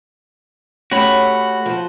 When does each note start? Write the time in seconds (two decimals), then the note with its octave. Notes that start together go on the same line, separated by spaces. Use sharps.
0.92 A3 C#4 F#4 G4 B5
1.66 F3 C5